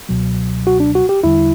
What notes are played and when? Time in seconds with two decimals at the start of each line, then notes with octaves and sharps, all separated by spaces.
0.09 C#2 B2 F#3
0.67 F#4
0.80 D4
0.95 F#4
1.09 G4
1.24 E2 D3 G3 E4